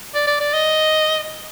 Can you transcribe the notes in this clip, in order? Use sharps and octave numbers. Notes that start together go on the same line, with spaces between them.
D5
D5
D5
D#5